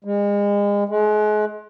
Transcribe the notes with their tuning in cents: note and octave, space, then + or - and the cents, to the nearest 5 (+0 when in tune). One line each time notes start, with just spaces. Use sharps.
G#3 -35
G#3 +35